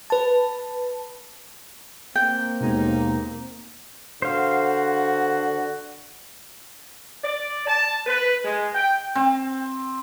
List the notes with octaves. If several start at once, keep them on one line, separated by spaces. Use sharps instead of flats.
B4 A5
A#3 C4 G5
D#2 B2 G#3 B3 D#4
D3 F#4 C5 F5
D5
A5
B4
G#3
G5
C4